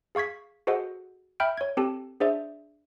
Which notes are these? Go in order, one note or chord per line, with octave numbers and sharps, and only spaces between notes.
G#4 F5 C#6 G#6 B6
F#4 G#4 A4 C5 D#5 F#5
E5 G5 B5 F6 G6 D7
C#5 G#6
C4 G4 A4 A5
D4 G#4 C5 D5 E5